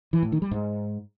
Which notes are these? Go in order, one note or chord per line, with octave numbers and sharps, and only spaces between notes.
E3
A2
D#3
G3
G#2